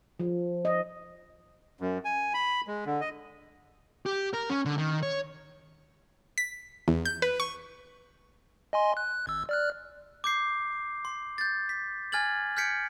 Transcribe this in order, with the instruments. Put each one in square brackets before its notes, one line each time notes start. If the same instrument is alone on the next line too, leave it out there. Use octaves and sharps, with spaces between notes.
[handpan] F3
D#5
[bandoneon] F#2
G#5
B5
G#3
D3
D#5
[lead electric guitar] G4
A#4
C#4
D3
D#3
C#5
[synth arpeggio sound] B6
E2
G6
B4
C#6
[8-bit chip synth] D#5 G#5 C6
F#6
G#1 E6
D5 F6 F#6
[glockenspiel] D6 G6 C7
C6
G6 A6
B6
G#5 F6 G#6 A6 F#7
F6 G6 G#6 B6 C#7 D7